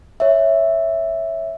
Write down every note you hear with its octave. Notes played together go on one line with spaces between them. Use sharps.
C#5 E5